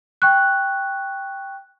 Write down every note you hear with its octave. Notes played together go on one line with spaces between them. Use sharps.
G5 C#6 F#6